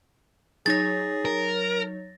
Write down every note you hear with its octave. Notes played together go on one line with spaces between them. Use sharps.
F#3 D#4 G#4 C#5 A6 A#6
A#4